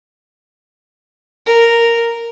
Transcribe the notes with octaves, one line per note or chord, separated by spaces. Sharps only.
A#4